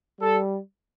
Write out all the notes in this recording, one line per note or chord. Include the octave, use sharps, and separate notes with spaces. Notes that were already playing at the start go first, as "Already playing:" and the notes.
G3 A4